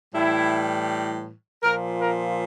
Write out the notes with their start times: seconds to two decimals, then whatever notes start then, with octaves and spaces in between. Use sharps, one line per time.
0.14 A2 E3 G3 E4
1.63 A#2 F3 A#4
2.00 A#4